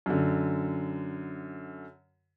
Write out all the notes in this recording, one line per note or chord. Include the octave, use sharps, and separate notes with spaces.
F#2 D3